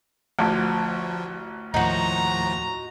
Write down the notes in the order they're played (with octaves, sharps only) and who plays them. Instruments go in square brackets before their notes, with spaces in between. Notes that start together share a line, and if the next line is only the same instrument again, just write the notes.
[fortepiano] A1 D2 [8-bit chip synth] F3
[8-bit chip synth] D#2 A2 F3 [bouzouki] D#4 F#4 [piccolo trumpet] A#5